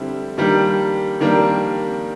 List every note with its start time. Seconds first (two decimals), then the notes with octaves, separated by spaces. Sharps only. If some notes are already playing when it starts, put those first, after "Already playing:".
Already playing: D3 G3 C4 E4
0.38 D#3 G3 A#3 D4
1.20 D#3 G3 A#3 D4